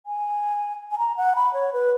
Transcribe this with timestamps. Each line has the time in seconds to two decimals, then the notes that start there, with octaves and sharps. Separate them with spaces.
0.06 G#5
0.91 G#5
0.98 A#5
1.17 F#5
1.36 B5
1.54 C#5
1.73 B4